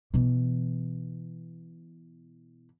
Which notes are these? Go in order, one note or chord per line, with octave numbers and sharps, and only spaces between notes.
B2 E3